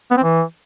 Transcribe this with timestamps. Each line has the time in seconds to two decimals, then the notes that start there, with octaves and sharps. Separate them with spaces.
0.11 B3
0.17 C4
0.23 E3